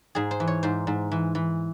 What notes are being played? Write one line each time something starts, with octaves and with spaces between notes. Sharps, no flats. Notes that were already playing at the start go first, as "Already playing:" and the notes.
G#2 G#4
C5
E3
C#5
G#2 C5
G#2
E3
E3